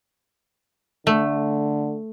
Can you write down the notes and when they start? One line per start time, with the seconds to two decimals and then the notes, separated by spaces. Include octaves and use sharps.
1.07 D3 A3